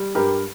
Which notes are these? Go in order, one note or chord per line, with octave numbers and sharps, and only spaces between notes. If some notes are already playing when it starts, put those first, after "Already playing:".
Already playing: G3
G2 G4 A#4